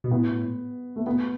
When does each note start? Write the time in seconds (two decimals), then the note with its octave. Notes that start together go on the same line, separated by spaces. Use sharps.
0.04 B2
0.11 A2 B3
0.96 A3
1.06 B3